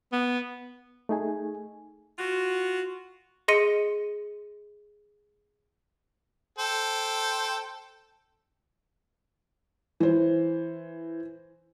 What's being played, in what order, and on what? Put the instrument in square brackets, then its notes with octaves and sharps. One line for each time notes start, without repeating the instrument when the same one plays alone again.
[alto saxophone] B3
[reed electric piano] A3 D#4 G#4 G#5
[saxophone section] F4 F#4
[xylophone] G#4 D#5 C6 A#6 C#7 D#7
[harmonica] A4 C5 G5
[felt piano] E3 C5